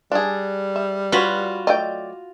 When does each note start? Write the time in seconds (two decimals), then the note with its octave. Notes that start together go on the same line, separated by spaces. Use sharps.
0.12 G3 D4 G#4
0.76 E5
1.12 F4 F#4 B4 C#5 B5
1.67 F#3 A3 D5 D#5 G5